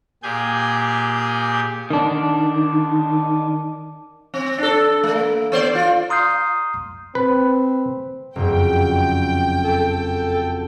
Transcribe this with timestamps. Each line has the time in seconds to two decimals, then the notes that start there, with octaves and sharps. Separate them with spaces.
0.23 A#2 G4 G#4 G#5 G6
1.90 D#3 D4
4.34 C4
4.58 D4 A4
5.04 A3
5.16 A#3
5.52 B3 C5 D5
5.75 F4
6.10 A#5 C6 D#6 F6 G6 C7
7.15 C4 B4
8.36 F#1 F2 G5
9.65 A4